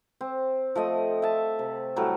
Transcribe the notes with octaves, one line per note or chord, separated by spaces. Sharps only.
C4
F3 A3 D#5
E5 A5
C3
A2 F#3 G3 A4